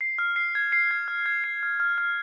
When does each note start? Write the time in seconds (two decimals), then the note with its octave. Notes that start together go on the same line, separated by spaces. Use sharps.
0.01 C7
0.19 F6
0.36 C7
0.55 G#6
0.72 C7
0.91 G#6
1.08 F6
1.26 G#6
1.44 C7
1.63 F6
1.80 F6
1.98 F6